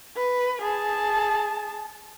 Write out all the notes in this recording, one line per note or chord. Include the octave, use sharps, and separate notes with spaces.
B4
G#4 A5